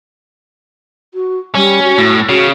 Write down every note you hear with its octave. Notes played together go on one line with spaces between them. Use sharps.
F#4
G3 C#4
F#4
A2
C#3 F#4